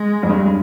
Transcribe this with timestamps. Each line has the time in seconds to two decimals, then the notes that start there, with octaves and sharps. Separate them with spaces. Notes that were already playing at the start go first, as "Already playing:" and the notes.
Already playing: G#3
0.23 F2
0.29 G2